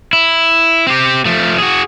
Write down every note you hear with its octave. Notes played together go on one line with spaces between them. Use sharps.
E4
C4 G4
F3 A3
F#4 G#4